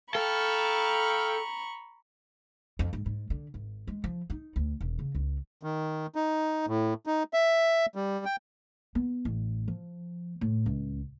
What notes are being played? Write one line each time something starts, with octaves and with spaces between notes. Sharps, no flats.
A4 F5 G5 A#5 B5 C#6
F2
G#2
G#2
D3
G#1
G#3
F3
D#4
D2
E1
C#3
C#2
D#3
D#4
A2
D#4
E5
G3
G5
B3
A1
F3
A2
C#2